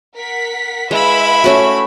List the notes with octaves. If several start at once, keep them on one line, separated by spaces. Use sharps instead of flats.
A#4 F#5 B6
G#3 E4 B4 E5 F5 B5
A3 C#4 F#4